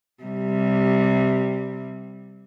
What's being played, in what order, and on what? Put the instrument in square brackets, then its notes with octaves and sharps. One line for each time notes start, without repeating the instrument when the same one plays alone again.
[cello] C3 G3